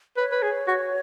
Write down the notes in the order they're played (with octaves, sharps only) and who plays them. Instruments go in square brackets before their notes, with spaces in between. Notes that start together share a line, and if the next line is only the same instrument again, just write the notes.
[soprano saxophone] B4 [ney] C#5
[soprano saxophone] B4
G#4
F#4